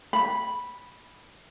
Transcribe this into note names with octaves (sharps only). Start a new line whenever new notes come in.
B5